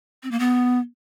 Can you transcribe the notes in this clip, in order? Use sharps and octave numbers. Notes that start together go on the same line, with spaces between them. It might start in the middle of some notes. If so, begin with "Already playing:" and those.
C4
A#3
B3